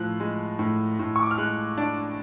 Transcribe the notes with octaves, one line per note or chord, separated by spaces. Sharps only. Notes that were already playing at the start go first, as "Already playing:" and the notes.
Already playing: A2 F3 F#6
G#3
A2
A2
C#6
D6
F6
G#3 F#6
D4